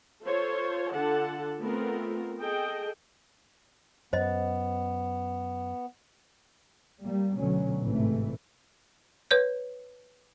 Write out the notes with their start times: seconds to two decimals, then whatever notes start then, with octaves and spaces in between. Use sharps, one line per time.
0.25 F4 A4 C5 C#5
0.93 D3 F4 A4 F#5 A5
1.62 A3 B3 C4 F4 A#4
2.38 G#4 A4 D#5 G5
4.13 F#2 B3 C5 D#5
7.04 G3 A#3
7.37 D2 B2 D3 F#3 C#4
7.80 A1 G#2 C3 E3 A3
9.31 B4 C#5 G6